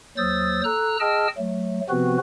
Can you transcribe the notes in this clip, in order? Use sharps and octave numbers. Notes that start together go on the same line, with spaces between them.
D#2 F#3 C5 D#6 E6 A6
A4 A#5 E6 F#6
G#4 D#5 G5 A5 E6 F6
F#3 A3
C3 F3 B3 C4 F#4 B4